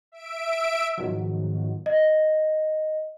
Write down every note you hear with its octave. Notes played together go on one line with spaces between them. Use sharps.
E5 D7
G#2 B2 D#3 F3 F#3
D#5